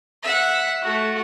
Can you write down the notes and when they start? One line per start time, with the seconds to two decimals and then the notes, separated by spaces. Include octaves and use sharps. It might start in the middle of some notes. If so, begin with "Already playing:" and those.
0.23 E5 F#5
0.82 A3 F#4